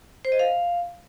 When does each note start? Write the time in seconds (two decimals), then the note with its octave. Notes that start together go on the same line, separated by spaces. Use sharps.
0.25 C5
0.32 D#5
0.39 F5